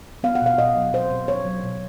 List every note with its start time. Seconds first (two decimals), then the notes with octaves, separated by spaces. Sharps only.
0.23 B3 F5
0.35 F#5
0.42 B2 F5
0.58 B2 D#5
0.76 F#3
0.93 B2 C5
1.11 B2
1.28 B3 C#5
1.45 F#3
1.64 B2